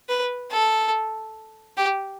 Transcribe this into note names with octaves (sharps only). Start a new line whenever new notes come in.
B4
A4
G4